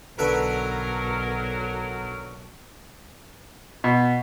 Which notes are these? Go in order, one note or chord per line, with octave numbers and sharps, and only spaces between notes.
B1 D3 F#3 A#4 B4 E5
B2